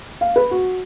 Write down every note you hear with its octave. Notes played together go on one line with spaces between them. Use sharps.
F5
B4
F#4